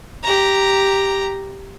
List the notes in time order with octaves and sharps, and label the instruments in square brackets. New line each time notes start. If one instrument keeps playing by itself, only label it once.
[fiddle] G4 A#5